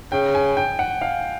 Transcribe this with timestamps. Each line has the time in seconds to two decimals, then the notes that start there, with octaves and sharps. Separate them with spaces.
0.12 C#3 G5
0.35 G#5
0.57 G5
0.79 F#5
1.01 F5